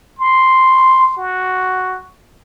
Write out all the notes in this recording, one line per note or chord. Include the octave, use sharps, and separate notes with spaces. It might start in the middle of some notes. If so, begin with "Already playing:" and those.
C6
F#4